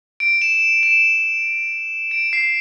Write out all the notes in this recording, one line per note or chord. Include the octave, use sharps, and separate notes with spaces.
D7
E7
E7
D7
C7